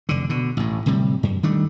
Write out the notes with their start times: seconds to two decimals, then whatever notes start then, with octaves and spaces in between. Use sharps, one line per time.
0.09 F1 D3
0.29 B2 D3
0.57 A1 A2
0.86 D1 C3 G3
1.23 F#2
1.43 D#3 G3 A3 D4